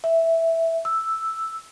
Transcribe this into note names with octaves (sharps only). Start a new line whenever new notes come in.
E5
E6